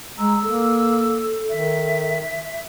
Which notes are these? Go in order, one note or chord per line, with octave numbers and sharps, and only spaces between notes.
G#3 A#5 E6
A#3 A4
D#3 E5